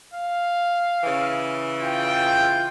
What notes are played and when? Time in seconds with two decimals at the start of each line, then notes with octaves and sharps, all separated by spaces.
0.14 F5
1.04 C#3 E3
1.82 F4 G5